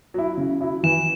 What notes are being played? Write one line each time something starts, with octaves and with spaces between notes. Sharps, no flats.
F#3 E4
C#3
F#3 E4
E3 E7